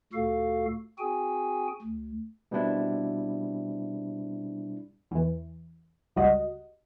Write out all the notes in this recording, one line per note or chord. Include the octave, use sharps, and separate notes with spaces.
D2 A#2 F#4 A4 F5
C4 F#4 G#4 G5 G#5
D2
B2 G3 C4 D4 E4
E2 E3
G1 C#2 G3 F#4 D#5